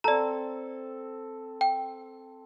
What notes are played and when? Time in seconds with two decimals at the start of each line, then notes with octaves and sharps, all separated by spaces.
0.04 C4 A4 D5 A#5
1.61 G5